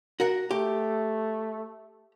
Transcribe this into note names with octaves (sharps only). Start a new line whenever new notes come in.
F#4 A#4 F#5
A3 G4